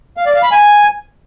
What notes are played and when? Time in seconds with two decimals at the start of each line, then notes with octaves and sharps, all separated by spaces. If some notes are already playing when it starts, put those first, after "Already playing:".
0.17 F5
0.26 D5
0.34 F5
0.43 B5
0.51 G#5